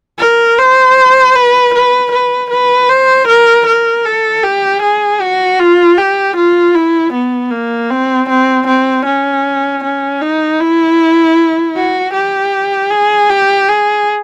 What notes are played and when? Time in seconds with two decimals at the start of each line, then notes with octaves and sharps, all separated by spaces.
0.19 A#4
0.58 C5
1.35 B4
1.74 B4
2.12 B4
2.51 B4
2.90 C5
3.27 A#4
3.66 A#4
4.05 A4
4.44 G4
4.82 G#4
5.21 F#4
5.60 F4
5.98 G4
6.37 F4
6.75 E4
7.13 B3
7.51 A#3
7.90 C4
8.29 C4
8.67 C4
9.06 C#4
9.84 C#4
10.21 D#4
10.60 E4
11.76 F#4
12.14 G4
12.91 G#4
13.30 G4
13.69 G#4